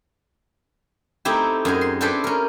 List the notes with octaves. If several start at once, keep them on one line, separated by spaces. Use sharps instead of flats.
A3 C4 D#4 E4 G4
F#2 G#4 D#5
C6
D4 E4 G4 A4 B4 C5
C#4 A#4